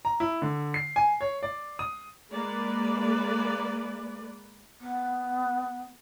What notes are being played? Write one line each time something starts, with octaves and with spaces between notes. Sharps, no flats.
A#5
E4
D3
C7
G#5
C#5
D5
D#6
G#3 A#3 B4 D5
B3